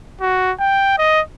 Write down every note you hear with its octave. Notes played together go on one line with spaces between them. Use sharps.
F#4
G5
D#5